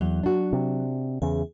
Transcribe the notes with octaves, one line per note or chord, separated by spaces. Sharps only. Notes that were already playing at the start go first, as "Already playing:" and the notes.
E2 F#3
D4 F#4
C3
E2 C#3 G#4